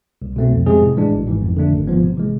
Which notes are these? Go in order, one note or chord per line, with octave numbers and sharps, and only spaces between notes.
C2
B2 A3 C4
F2
C3 G#3 C4 G#4
A2
E3 G#3 D4
G#1
G#2 E3
F2
D3 A3 D4
G#1
G#2 F3 B3
C3
E3 G#3